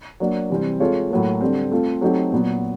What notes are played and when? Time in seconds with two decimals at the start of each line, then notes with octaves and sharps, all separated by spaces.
0.20 F#3 A#3 D4
0.50 C3 E3 G3 C4
0.80 G#3 C4 F4 A4 C#5
1.10 A2 F#3 A#3
1.41 D3 G3 C4
1.72 A3 C4 F4
2.01 F#3 A3 C4 D#4 G4
2.32 A#2 F#3 B3